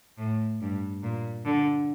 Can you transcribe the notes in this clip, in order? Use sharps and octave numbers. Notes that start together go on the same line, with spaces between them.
A2
G2
A#2
D3